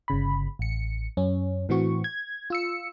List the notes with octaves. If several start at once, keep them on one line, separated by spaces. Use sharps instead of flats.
G1 C#3 B5
A1 C#7
F#2 C#4
A2 E3 C4 F#4 C#6
G#6
F4 E6 C#7